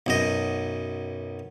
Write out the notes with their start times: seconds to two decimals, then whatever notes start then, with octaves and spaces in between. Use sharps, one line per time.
0.06 B1 F#2 D#5